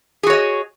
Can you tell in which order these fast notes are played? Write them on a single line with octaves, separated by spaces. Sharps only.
G#4 F#4 C#5 D#5